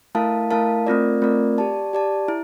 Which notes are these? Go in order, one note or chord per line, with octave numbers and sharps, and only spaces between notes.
A3 E4 A#4 F5 A5
A3 E4 A#4 F5 A5
A3 C4 F4 A#4 D5
A3 C4 F4 A#4 D5
G4 D5 A5
G4 D5 A5
E4